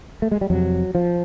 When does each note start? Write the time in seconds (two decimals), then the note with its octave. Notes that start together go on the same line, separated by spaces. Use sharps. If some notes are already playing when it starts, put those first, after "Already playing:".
0.22 A3
0.31 G#3
0.41 G3
0.50 F2 C3 F#3
0.95 F3